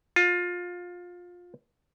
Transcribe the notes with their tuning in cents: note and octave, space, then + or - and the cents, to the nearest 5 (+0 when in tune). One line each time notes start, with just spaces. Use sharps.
F4 +20